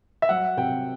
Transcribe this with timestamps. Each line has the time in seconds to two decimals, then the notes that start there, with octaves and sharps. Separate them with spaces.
0.22 E5
0.29 F#3 F#5
0.57 C3 G5